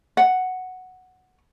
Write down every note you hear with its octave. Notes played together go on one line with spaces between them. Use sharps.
F#5